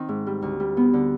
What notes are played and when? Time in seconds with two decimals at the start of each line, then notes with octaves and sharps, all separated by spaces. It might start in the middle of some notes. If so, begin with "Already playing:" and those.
Already playing: D#3 C4
0.09 G#2
0.27 G3
0.42 D2
0.60 G3
0.77 B3
0.93 D3